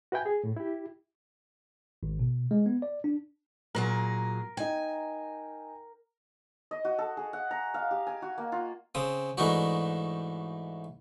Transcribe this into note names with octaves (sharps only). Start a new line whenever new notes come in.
F#4 B4 E5 G5 G#5
G#4
A2
E4 G4
G#1
B2
G#3
B3
D5
D4
A#2 F#3 G#4 A#4
D#4 G5 G#5
D#5
F#4
A4
G#4
F#5
A#5
F5
G4
G#5
F#4
A#3
F4
C#3 C4 D#6
G#2 E3 A3 D4 D#4 F#4